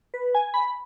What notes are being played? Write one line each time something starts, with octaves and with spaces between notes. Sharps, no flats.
B4
G#5
B5